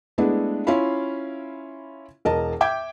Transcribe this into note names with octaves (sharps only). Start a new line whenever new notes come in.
G#3 A3 B3 D4 E4
C#4 E4 F4 F5 B5
E1 A#4 D#5 A5
E5 G5 D6 G6 G#6